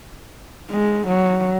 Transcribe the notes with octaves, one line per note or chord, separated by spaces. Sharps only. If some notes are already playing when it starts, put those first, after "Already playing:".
G#3
F#3